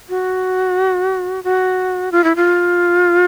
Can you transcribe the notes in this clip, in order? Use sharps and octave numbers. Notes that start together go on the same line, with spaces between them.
F#4
F#4
F4
E4
F4